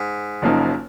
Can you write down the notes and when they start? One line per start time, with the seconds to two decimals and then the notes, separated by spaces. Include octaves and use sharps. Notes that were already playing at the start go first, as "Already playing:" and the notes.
Already playing: G#2
0.42 F#1 F#2 F3 A#3 D#4